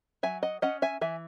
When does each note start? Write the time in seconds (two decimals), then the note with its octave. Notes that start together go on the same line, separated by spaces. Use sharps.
0.23 F#3 E5 G#5
0.43 D#5 F#5
0.62 C#4 D#5 F#5
0.82 E5 G#5
1.01 E3 E5 G#5